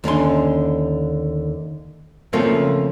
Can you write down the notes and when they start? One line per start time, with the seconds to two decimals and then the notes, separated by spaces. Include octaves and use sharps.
0.04 D#2 D3 C#4 C6
2.33 C#3 F3 A3 A#3 C4